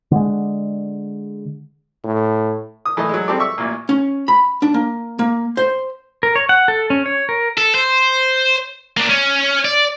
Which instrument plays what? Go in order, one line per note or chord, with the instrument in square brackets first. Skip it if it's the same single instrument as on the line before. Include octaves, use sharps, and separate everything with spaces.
[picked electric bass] D3 G#3
[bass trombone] A2
[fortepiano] D#6
E3 A3 D#5
F#3 G#3
G3 G#3 C4 G4 A4 D5
E5 C#6 E6
A1 A#2
[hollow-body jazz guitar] C#4
B5
D4
A#3
A#3
C5
[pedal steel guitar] A#4
C#5
F#5
A4
C#4
C#5
A#4
[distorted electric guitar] A4
C5
A#3 D4
C#4
D5